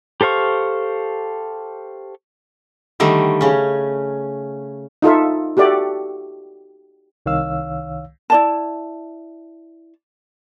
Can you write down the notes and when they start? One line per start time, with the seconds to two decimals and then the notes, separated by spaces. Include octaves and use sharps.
0.21 G4 A4 C5 F5 C#6
3.00 D3 D#3 G3 A3
3.41 C#3 C#4
5.02 D#4 F4 A4 E5
5.57 F#4 G4 A4 D5 E5
7.26 C2 D#3 C#5 F5 E6
8.30 E4 D5 A5